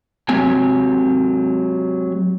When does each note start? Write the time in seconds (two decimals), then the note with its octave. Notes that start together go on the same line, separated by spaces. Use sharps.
0.29 F#3 G#3 C4 G4 G#5